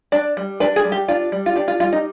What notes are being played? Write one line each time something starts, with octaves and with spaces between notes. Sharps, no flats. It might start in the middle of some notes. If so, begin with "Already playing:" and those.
D4 D5
G3
D4 B4
G#4
G3
G4
D4 F4
G3
F4
D4 G4
F4
G3 F4
D#4